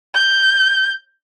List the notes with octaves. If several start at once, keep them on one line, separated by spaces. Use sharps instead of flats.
G6